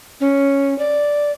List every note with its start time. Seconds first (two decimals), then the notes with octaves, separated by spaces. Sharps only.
0.21 C#4
0.79 D5